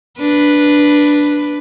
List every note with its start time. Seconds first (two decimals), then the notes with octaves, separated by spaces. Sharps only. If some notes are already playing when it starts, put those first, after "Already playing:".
0.19 D4 B4